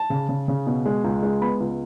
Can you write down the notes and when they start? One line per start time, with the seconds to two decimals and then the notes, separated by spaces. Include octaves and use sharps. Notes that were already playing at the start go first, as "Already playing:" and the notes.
Already playing: A5
0.10 C#3
0.29 C#3
0.48 C#3
0.67 B2
0.86 G#3
1.04 C#2
1.23 G#3
1.42 B3 B5
1.60 C#2